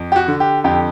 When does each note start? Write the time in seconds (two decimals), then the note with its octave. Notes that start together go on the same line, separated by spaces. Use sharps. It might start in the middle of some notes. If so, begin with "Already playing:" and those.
Already playing: F2
0.12 G4
0.16 F#4
0.28 D3
0.40 G4
0.64 F2 G4